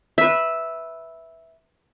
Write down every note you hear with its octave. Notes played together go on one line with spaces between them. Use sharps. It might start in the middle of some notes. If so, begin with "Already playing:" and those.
B4 E5